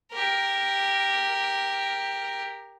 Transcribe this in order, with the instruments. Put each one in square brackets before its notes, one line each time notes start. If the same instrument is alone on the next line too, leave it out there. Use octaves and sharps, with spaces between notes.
[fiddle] G4 A#4